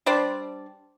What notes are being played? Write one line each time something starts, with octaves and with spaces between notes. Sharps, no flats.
G3 D4 C5 D5